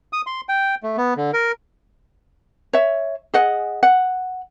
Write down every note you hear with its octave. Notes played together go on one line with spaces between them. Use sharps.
D#6
C6
G5
A3
B3
D3
A#4
C#5 E5
G#4 D#5 F#5
F#5